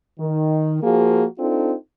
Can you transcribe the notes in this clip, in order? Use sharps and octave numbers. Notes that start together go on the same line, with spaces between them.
D#3
F3 A#3 F#4 G#4
C4 D4 D#4 F4 A4